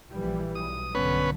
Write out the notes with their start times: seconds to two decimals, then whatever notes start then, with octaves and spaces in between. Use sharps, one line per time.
0.11 A#1 E3 G3
0.55 B1 D#6
0.95 B1 G2 D3 B3 C#4 B4